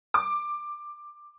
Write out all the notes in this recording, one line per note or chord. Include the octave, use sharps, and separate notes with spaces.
D6